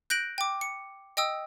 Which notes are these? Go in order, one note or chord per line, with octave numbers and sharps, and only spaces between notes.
F#6 G6 A#6 D7 F#7
G5 D6
C#7
D#5 G5 D#6 E6